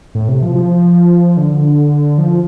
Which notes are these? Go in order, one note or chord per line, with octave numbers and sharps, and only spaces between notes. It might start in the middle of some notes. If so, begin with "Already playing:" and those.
A2
C3
F3
F3
D3
F3